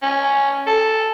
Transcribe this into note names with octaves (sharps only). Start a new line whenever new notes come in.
C#4
A4